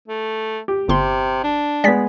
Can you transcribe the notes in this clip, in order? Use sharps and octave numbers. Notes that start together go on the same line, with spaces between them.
A3
G4
G1 C3 C6
D4
G#3 B3 D5 B6